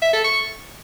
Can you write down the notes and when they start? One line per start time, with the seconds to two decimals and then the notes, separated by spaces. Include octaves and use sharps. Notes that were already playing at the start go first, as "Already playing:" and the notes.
0.02 E5
0.13 A4
0.24 C#6